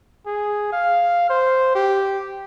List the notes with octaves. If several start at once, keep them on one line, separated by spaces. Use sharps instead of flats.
G#4
F5
C5
G4